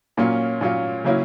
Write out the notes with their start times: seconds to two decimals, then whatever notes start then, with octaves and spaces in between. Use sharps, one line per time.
0.17 A#2 F#3 A#3 C#4 F4
0.61 A#2 F#3 A#3 C#4 F4
1.04 C#3 F#3 A#3 C#4 E4